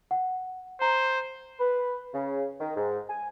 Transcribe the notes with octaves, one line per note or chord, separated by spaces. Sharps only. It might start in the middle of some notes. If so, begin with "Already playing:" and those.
F#5
C5 A#5
B4
C#3
D#3
G#2
G#5